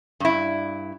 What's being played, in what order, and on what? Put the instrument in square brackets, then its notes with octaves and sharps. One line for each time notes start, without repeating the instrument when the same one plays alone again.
[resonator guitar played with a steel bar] G2 E4